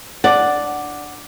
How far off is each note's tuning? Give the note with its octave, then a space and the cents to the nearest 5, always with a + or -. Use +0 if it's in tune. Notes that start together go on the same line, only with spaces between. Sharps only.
D4 +0 D5 +0 F#5 +0